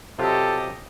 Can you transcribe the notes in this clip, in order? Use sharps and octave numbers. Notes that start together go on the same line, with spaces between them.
C3 F#3 F4 G4 A4 D#5